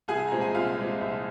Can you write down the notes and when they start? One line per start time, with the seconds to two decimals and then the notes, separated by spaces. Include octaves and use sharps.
0.08 C2 G#4 G#5
0.27 A#2 G#3 C4 A#5
0.41 G#5
0.54 C2 F4 F5
0.77 A#2 G#3 C4
1.01 C2